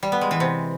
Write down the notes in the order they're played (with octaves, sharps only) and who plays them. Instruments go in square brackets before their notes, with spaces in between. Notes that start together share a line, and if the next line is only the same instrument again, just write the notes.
[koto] G3
B3
G#3
E3
C3